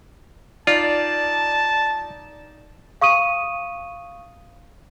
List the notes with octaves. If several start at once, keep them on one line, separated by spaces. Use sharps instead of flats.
D#4 F4 D5 A5
F5 C#6 D#6 D#7